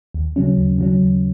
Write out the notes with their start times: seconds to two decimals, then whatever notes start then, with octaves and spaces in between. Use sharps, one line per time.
0.14 D#2
0.36 C#3 F#3 C#4
0.58 D#2
0.78 C#3 F#3 C#4
1.00 D#2